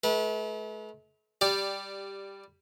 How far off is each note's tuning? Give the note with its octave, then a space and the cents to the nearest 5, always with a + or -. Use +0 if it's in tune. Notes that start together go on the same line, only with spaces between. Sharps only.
A3 -45 B4 -30
G3 +5 G4 +0 D5 +0